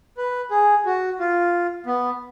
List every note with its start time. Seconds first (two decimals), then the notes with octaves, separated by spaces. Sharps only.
0.18 B4
0.51 G#4
0.86 F#4
1.19 F4
1.86 B3